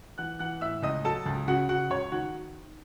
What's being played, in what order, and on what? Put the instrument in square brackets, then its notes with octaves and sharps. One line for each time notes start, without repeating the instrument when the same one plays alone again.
[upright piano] E3 F#5 F#6
E3 F#5 F#6
A2 E5 E6
C#2 D#5 D#6
F#3 A4 A5
C#2
C#3 F#4 F#5
C#3 F#4 F#5
C#2 C#5
D#3 F#4 F#5